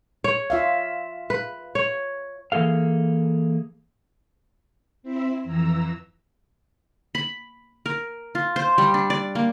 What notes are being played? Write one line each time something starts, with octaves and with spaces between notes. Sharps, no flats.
C#5
F4 E5 F5
B4
C#5
E3 A#3 G#4 A4 F5
C4 E4 E5
F2 E3 A#5 E6
B5
A#4
F4
C5
G3
D4
D5
A#3